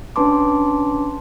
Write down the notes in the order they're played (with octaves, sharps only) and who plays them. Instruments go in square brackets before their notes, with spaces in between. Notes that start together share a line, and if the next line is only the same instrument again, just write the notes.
[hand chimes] C#4 D4 B4 A5 C6 D6